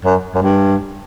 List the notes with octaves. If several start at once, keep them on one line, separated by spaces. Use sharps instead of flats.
F#2
F#2
G2